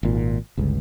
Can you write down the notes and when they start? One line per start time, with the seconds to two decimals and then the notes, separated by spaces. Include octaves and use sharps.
0.03 G#1 A#2
0.57 G1 C#2